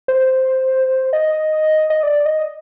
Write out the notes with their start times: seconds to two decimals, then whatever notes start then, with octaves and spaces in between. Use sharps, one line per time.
0.08 C5
1.13 D#5
1.90 D#5
2.03 D5
2.26 D#5